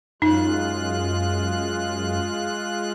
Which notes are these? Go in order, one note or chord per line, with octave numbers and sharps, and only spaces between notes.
F#2 G#3 D#4 F4 F#6